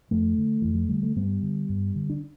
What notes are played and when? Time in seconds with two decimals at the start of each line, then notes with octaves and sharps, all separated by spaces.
0.11 F2 F3 A3
0.38 D3
0.62 F2 E3
0.75 F3
0.89 D3 G3
1.03 A3
1.16 G2 G3 B3
1.43 D3
1.69 G2
1.96 D3
2.10 D4